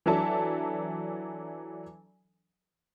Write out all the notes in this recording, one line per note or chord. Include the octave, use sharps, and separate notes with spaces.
E3 F#3 D4 A4 E5 A5